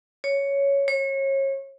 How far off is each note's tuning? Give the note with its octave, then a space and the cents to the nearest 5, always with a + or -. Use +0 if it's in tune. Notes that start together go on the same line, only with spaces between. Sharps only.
C#5 +5
C#5 -30